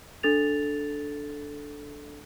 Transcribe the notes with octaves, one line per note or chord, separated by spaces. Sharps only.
D4 A4 A6 F7